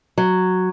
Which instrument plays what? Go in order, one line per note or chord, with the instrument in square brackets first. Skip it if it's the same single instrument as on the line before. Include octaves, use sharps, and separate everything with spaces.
[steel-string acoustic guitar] F#3